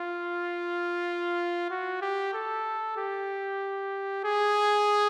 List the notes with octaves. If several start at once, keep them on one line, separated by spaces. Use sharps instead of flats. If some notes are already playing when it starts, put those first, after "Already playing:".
Already playing: F4
F#4
G4
A4
G4
G#4